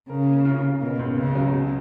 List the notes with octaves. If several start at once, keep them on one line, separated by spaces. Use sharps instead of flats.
C#3 A#4
A#3
F4
F4
B2 A#3
C#2
C#2 C#3
F#3
B2